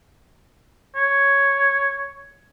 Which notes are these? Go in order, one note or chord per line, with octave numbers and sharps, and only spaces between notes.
C#5